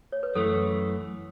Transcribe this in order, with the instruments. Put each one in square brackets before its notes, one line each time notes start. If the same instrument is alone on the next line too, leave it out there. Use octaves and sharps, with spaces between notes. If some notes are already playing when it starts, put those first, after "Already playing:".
[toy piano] C#5
B4
[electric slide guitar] F#2 E3 A3 [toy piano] A4